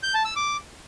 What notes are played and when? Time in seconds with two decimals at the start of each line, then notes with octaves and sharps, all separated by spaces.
0.03 G6
0.14 A5
0.25 E6
0.36 D6